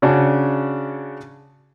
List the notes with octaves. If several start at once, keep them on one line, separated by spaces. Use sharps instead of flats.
C#3 C#4 D4 F#4